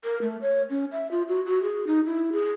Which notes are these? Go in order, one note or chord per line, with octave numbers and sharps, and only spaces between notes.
A#4
A3
C#5
C#4
E5
F4
F#4
F#4
G#4
D#4
E4
G#4